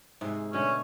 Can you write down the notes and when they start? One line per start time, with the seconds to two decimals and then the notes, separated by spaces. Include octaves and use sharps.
0.21 G#2 C3 G#4
0.53 B2 D3 A3 C#4